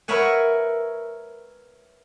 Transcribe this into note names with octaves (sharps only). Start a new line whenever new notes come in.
A#4 B4 C#5 E5 F#5 G#5